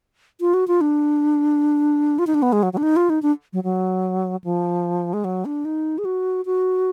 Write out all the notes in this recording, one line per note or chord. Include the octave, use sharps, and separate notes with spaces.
F4
F#4
F4
D4
F4
D#4
D4
B3
G#3
F#3
F#3
D4
D#4
F4
D#4
D4
F#3
F#3
F3
G#3
F#3
D4
D#4
G#4
F#4
F#4